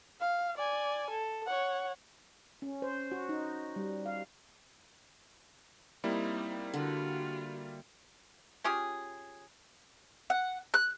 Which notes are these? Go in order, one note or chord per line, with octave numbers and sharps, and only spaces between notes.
F5
D5 G#5
A4
C#5 F#5
C#4
C5
F#4
D#4
G3
F5
G3 A#3 C4 D#4 E4
D3 F4 F#4
C#4 F4 G4 G#4
F#5
F#6